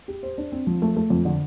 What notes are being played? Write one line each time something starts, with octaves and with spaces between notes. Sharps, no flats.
G4
C5
D4
C4
F3
A3
A3
F2
D3